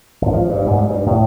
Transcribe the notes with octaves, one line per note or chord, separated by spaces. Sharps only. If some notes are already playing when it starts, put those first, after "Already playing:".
G#1
F3
G2
G#2
G3
G2
A2